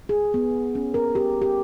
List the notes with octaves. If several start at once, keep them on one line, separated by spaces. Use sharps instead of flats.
G#4
B3
C#4
A#4
G4
G4